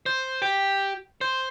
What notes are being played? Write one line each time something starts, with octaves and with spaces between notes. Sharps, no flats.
C5
G4
C5